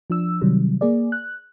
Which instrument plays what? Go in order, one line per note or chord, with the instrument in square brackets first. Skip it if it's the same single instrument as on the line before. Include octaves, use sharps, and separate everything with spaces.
[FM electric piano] F3 D4 E6
C3 D#3 F#3 G3
A#3 G#4 D5
F#6